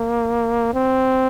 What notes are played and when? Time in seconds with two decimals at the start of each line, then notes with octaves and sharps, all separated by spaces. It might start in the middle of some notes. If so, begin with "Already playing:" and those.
Already playing: A#3
0.74 C4